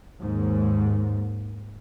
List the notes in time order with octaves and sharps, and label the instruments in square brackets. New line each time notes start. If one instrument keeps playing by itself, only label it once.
[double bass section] D#2 G#2